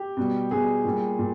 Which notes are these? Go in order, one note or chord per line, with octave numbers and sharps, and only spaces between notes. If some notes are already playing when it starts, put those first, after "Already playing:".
Already playing: G4
B2 G3
B2 G3 G#4
A#2 G3
A#2